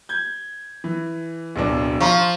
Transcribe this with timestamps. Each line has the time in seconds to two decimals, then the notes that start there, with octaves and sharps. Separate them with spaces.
0.09 G6 G#6
0.84 E3
1.56 D1 B1 D4
2.00 F3 F5 A#5 C#6